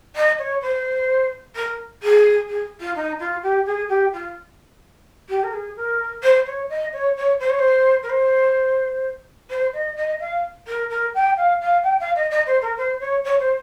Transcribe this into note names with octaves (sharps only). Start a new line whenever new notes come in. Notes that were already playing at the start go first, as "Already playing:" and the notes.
D#5
C#5
C5
A#4
G#4
G#4
F4
D#4
F4
G4
G#4
G4
F4
G4
A#4
G#4
A#4
C5
C#5
D#5
C#5
C#5
C5
C#5
C5
A#4
C5
C5
D#5
D#5
F5
A#4
A#4
G5
F5
F5
G5
F5
D#5
D#5
C5
A#4
C5
C#5
C#5
C5